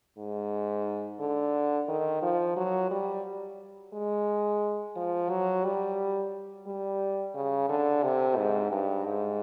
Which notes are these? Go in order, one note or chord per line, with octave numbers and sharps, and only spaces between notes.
G#2
D3
D#3
F3
F#3
G3
G#3
F3
F#3
G3
G3
C#3
D3
C3
G#2
G2
G#2